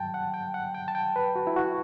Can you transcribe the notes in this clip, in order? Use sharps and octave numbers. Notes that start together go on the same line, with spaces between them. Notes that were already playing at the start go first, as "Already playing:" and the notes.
Already playing: G2 F#3 G5 A5
F#5
G5
F#5
G5
A5
G5
B4
F#4
E4
F#4